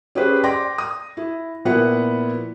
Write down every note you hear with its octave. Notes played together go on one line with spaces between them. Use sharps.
C#4 G4 G#4 B4 C5
D5 G5 C6 D6 A#6
D#6
E4
A#2 F3 B3 E4 B4 F#5